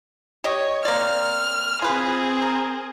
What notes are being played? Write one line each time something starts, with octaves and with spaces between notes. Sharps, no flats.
G4 C#5 D#5
A#3 C4 D5 F6
C4 F4 G#4 B4
A#4